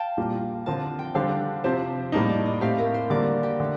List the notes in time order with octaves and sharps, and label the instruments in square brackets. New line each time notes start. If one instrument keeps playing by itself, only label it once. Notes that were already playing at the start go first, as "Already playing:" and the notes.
Already playing: [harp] F5 G5 A5
[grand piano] A#1 A#2 G3 A#3 F4
[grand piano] D3 F3 C4 F4 A#4 [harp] A5
[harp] G5
[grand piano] D3 G3 D4 A4 C5 [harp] F5
[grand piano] C3 F3 C4 G4 C5 [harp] A5
[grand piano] A2 G3 A#3 D#4 [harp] A5
[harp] D5
D#5
[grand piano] A2 A3 C4 G4 [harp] F5
[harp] A#4
C5
[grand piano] D3 G3 A#3 [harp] D5
[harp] G4
[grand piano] D3 A3